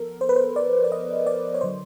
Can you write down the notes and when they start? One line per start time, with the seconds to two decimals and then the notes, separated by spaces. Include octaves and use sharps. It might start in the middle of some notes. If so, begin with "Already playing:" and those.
Already playing: F3 B3 A4 A#4
0.21 C5
0.29 B4
0.36 C5
0.56 D5
0.84 D5
0.92 D#5
1.27 D5
1.54 C#5
1.61 D3 F#3 C5